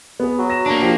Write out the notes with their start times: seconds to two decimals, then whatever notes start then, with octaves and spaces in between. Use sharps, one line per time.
0.20 B3 G#4
0.38 F#3
0.50 A#6 E7
0.66 A#3 D4
0.81 F3 G4